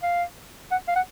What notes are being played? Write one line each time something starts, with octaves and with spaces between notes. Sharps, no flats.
F5
F#5
F5
F#5